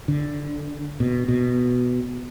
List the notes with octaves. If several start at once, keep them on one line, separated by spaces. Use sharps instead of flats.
D3
B2
B2